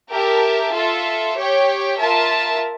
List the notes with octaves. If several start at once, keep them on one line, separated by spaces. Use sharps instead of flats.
G4 A#4 E5 A5
F4 A4 E5
G4 C#5 G5
F4 A#4 E5 A5